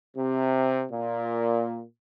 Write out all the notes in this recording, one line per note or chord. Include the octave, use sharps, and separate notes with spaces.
C3
A#2